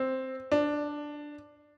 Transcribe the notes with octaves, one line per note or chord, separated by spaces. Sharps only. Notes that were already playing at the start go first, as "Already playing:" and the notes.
Already playing: C4
D4